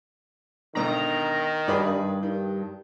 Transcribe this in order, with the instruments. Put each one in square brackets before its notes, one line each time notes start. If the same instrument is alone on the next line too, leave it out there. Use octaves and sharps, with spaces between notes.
[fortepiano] G#1 B2 D3 [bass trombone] D#3 [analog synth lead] A#5
[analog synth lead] G2 [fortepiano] G#4 B4 D5
[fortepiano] D#3